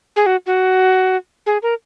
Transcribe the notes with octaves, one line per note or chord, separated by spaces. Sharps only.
G#4
F#4
F#4
G#4
A#4